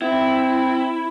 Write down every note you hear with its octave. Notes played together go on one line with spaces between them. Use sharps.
C4 E4